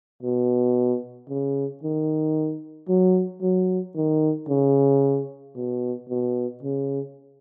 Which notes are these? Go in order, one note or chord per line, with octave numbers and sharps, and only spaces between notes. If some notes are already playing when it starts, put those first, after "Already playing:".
B2
C#3
D#3
F#3
F#3
D#3
C#3
B2
B2
C#3